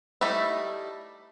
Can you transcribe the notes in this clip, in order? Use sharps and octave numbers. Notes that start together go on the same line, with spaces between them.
G3 A3 D#4 E4 E5